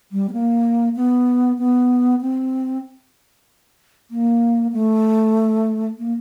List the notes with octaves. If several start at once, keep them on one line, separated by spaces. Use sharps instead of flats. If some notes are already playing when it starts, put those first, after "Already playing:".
G3
B3
A#3
B3
B3
C4
A#3
A3
A#3